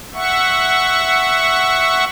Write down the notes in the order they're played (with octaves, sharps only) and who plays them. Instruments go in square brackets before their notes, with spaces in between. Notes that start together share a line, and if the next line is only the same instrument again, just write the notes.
[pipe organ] E5 F#5 C#6